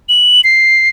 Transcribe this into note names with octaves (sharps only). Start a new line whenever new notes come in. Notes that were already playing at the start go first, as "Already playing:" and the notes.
F#7
C7